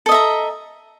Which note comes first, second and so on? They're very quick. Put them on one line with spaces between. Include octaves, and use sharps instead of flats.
A4 D#5 E5 A#5